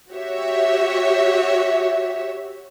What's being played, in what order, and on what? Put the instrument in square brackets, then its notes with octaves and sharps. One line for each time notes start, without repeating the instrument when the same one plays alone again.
[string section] F#4 G4 C#5 E5